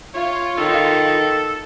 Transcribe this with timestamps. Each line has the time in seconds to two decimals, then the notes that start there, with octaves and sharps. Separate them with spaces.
0.14 F4 C#5
0.58 D#3 A4